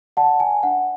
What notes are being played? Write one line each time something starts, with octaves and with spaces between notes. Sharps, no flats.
D5 F#5 A5
G#5
D4 F#5